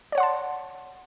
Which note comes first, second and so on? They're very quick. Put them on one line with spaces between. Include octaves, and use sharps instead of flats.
D5 C#5 F#5 C6 A5